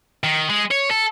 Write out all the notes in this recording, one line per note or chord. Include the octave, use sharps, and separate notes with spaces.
D#3
G#3
C#5
A4